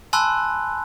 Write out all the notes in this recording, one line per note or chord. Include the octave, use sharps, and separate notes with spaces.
G#5 A5 B5 C6 E6 F#6